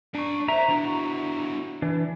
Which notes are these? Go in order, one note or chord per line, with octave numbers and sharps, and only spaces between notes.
D4 D5 A#5 C#6
A#4 C5 E5 A#5
B3 D4 E4 F#4
E3 D4 E4